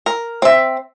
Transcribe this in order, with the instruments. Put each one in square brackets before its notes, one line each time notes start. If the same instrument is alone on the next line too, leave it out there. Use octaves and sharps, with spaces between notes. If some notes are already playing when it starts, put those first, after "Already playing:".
[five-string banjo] A#4
C4 E5